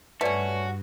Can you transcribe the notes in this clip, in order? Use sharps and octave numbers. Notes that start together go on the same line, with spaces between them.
G2 A3 C#4 F#4 B4 D5